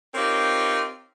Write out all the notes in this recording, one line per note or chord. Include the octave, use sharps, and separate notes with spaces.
C4 D#4 F4 G4 A#4 C#5